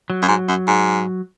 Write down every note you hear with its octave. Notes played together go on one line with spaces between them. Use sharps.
F#3
F#2
G#2
F#2
G#2